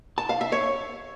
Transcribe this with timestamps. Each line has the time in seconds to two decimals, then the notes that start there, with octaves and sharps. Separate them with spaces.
0.18 A5
0.29 F5
0.41 E5
0.52 C#5